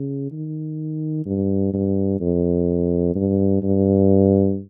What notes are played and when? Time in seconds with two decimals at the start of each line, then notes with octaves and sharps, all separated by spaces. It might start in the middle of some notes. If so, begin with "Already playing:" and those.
Already playing: C#3
0.32 D#3
1.26 G2
1.73 G2
2.20 F2
3.15 G2
3.63 G2